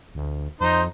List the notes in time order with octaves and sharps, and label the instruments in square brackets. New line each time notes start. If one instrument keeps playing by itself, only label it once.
[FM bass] D2
[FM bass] F2 [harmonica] D#4 C5